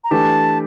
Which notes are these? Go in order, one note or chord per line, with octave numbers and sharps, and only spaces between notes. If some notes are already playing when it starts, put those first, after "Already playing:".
A#5
E3 A3 D4 G4 A5